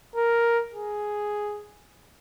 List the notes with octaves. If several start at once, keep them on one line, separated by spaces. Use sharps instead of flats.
A#4
G#4